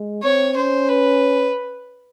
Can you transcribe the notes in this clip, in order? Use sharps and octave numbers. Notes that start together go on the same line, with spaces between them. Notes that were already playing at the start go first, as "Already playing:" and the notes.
Already playing: G#3
C4 C#5
C#4 C5
B4